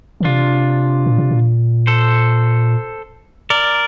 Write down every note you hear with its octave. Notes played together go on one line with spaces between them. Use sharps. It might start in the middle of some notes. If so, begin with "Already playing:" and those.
D3
C3 D4 F4
A#2
C3
A#2
A4 C5
A#4 D5